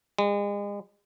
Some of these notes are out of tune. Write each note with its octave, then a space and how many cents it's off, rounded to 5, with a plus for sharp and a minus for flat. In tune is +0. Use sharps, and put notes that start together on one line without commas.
G#3 -40